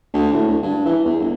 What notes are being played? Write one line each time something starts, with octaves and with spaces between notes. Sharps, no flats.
D2
A2
D2
G2
E3
E2
G1